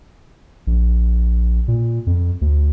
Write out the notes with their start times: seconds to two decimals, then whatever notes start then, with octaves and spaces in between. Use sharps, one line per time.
0.67 A#1
1.68 A#2
2.07 F2
2.41 D2